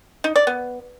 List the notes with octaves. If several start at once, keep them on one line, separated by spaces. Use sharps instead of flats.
D#4
D5
B3